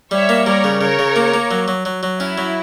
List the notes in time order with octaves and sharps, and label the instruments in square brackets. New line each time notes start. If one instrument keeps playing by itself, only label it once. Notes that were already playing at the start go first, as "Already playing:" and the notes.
[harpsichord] G3 [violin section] C#5 E5
[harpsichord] A#3
[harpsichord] G3 [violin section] A#4 C#5
[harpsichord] C#3
[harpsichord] C#3 [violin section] A#4 C#5
[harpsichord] C#3
A#3
A#3
F#3
F#3
F#3
F#3
[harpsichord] C#4 [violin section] E4
[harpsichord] F#3